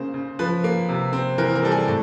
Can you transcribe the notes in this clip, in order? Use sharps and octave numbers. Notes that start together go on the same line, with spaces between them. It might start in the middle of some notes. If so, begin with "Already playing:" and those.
Already playing: C#3 A#3 C5
C#3
F3 B4
A#3
C3
C4
E3 A#4
A#4
G3 A4
G#4
A2 A4